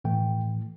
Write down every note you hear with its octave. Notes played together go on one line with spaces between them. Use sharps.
A2 E3 A3 G5